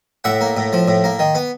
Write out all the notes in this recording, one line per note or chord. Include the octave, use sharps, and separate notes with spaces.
A2 E5 F#5
A#3
A2
F3
A2
A#3
D#3
B3